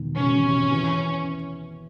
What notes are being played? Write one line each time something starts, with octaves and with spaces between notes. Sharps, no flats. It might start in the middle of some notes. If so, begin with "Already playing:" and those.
Already playing: E1 E2 D#3
E1 C#4
C3
E3